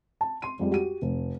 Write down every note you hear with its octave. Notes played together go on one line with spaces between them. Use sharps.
A5
C6 D#7
F2 G3 G#3
F#4 G4 D#7
F1